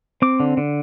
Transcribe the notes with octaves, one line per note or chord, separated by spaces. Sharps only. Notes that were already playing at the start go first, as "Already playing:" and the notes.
C4 D6
D3
D3